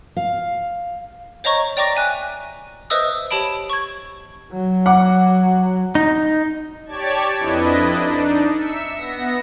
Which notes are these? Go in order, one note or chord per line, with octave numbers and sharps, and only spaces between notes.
F5
C5 C#5 D#5 A#5 C#6
D5 G5 A#5 C#6 D6 A#6
E5 G#5 F#6
B4 C5 D#5 E5 D#6 E6
G4 C#5 A5 B5 D7
C#6 G#6
F#3
F#5 D6
D#4
G4 C#5 D5 A5 G#6
F2 D4 E4 B4 D#5
D4 D#4
E5 E6 C#7
B3 A#6